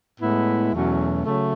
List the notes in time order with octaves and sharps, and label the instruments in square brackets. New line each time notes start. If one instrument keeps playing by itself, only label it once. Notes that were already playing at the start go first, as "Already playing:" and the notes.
[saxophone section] A2 G#3 B3 E4
E2 B2 F#3 A3 C#4
C#3 F#3 A3